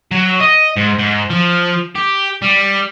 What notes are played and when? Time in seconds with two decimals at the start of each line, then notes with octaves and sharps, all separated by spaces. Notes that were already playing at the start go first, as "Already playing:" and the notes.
0.11 F#3
0.40 D#5
0.76 G#2
0.99 G#2
1.30 F3
1.95 G4
2.42 G3